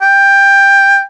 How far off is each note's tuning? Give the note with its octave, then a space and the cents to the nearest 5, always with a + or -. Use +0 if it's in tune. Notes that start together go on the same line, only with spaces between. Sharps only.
G5 +15